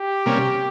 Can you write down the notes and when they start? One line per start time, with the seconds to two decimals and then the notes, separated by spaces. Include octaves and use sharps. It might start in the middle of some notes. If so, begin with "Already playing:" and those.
Already playing: G4
0.26 C3 G3 A#3 C#4